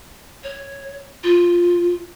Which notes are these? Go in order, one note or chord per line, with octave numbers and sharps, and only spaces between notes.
C#5
F4